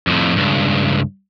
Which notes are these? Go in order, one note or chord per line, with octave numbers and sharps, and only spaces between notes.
F2 A2
C#2 G2